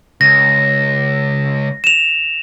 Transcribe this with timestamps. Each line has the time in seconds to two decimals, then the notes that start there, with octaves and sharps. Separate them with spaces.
0.21 C#2 A#6
1.84 E7 F7